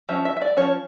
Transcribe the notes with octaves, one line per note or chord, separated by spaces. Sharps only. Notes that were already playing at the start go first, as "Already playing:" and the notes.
F3 C#4 E5
E5
E5
D5
F3 C#4 C#5